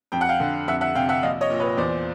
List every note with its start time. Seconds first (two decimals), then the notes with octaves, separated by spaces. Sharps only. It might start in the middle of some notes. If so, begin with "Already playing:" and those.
0.12 F2 G5
0.21 F#5
0.29 F5 G5
0.40 D3
0.67 F2 E5 F#5
0.81 E5 F#5
0.95 C3 F5 G5
1.09 E5 F#5
1.23 A#1 D#5 F5
1.41 C#5 D#5
1.50 A#2
1.59 B4 C#5
1.77 E2 C5 D5